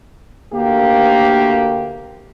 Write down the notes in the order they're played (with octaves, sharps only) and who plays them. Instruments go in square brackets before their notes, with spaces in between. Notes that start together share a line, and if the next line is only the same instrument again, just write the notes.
[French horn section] D2 A#3 G4